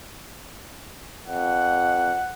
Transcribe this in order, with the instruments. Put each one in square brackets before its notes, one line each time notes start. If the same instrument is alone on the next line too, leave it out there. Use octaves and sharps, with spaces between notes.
[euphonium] F2 [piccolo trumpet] F#5